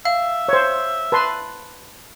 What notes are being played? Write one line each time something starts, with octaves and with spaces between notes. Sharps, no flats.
E5 F5
C5 C#5
B4 A5 C6